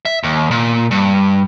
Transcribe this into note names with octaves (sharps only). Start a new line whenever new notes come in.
E5
D#2
A#2
G2